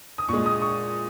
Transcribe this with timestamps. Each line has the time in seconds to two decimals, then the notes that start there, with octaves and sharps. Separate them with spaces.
0.18 D#6
0.29 A#2 G#3 C#6
0.46 D#6
0.62 C#6